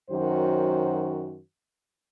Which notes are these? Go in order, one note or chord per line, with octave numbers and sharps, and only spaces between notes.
F#2 D#3 F#3 F#4 C5